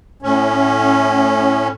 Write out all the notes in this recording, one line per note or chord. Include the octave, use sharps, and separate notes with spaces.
A2 C#4